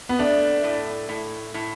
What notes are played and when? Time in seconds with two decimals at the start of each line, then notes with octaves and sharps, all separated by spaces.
0.09 B3
0.19 A3 D4
0.64 A2
1.09 A2
1.54 A2